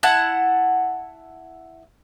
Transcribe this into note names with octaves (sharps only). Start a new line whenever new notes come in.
E4 F#5 A5